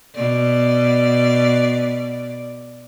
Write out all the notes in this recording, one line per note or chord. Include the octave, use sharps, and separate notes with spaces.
B2 D5